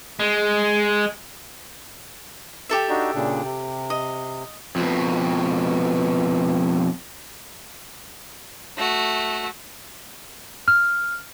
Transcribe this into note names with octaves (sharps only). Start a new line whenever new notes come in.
G#3
G4 A4 E5
D4 D#4 F#4
A#2 C#3 D4
C3
D#5
F2 B2
A3 F#4
F6